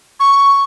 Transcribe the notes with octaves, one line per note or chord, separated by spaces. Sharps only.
C#6